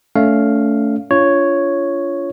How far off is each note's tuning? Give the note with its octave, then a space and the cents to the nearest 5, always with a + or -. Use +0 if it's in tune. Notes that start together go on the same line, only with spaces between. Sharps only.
A3 +0 C#4 +35 F5 +0
D4 -40 F4 -20 C#5 +0